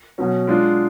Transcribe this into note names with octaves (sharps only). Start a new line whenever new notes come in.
B2 F#3 C#4
G#3 D4 F4